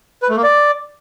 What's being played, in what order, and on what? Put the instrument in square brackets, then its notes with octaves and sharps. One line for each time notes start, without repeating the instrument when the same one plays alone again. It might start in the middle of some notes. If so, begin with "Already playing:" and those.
[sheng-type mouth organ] B4
A3
A#3
D5